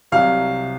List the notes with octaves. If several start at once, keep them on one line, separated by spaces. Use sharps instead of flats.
C2 C3 F#3 F5